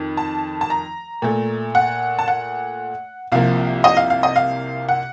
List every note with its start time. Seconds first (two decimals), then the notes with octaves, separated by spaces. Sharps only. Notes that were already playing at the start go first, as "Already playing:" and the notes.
Already playing: F2 D#3
0.17 A5
0.61 A5
0.70 A#5
1.22 A#2 A3
1.75 F#5
2.19 A5
2.28 F#5
3.32 C2 C3 F3 A#3 F5
3.84 D#5
3.97 F5
4.10 F5
4.23 D#5
4.36 F5
4.89 F#5